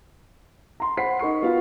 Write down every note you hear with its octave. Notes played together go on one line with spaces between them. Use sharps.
A#5 C6
C5 F#5 B5 B6 C7
D#4 A#4 C#6 C7
B3 F4 F#4 B4 F5